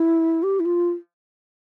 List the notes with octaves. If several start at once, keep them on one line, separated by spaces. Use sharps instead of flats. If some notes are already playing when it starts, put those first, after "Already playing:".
Already playing: E4
G4
E4
F4